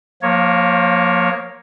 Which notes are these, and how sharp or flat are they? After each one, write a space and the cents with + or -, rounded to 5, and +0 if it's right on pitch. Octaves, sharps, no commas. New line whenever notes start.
F3 +30 A#3 +0 C#5 +0